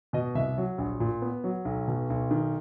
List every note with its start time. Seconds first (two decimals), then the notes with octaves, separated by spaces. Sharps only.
0.13 B2 D#5
0.35 C2 E5
0.58 F#3
0.78 A#1
1.00 A#2
1.22 B3
1.44 F#3
1.65 B1
1.88 B2
2.10 B1
2.31 D#3